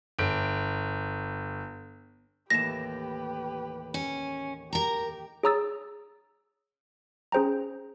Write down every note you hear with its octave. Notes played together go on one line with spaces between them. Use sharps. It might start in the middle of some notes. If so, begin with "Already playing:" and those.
G1 D7
D#2 A2 E3 G4 B4 A#6 E7
C#4
G4 A#4 A#5
G#4 C#5 A#5 D#6 E6 A6
C#4 G#4 C5 G5 A#5